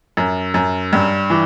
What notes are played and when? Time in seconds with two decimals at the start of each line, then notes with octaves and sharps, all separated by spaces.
0.17 F#2
0.54 F#2
0.93 G2
1.30 E3